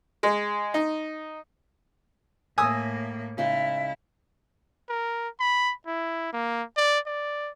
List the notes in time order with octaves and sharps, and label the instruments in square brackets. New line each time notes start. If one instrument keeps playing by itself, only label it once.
[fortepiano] G#3
D#4
[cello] A2 A#3 [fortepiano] G#5 D#6 E6
[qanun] C#3 G#3 D#4 [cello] E4
[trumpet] A#4
B5
E4
A#3
D5
D5